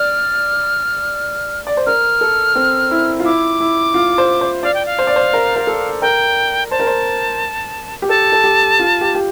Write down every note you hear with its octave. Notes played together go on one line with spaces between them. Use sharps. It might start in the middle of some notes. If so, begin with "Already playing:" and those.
Already playing: D5 F6
D5
C5
A#4 F6
A4
C4
E4
F4
E4 D6
E4
F4
C5
C5
D5 F5
G5
F5
C5
D5
C5
A#4
A#4
A4
A#4 G5
C5 A5
A#4
C5
G4
A4 A5
A4
G4
F4
G4
G4